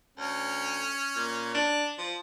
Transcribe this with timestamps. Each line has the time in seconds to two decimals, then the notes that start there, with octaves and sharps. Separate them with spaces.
0.18 D2 C#4
1.16 A#2
1.54 D4
1.98 F3